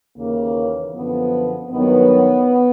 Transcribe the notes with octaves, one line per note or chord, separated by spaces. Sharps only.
D#2 C#3 E3 A#3
F#2 D3 F3 B3
G2 D#3 F#3 B3